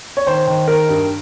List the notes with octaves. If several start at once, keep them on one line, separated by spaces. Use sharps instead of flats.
C#5
D#3 C5
D#3
D#3 A#4
G2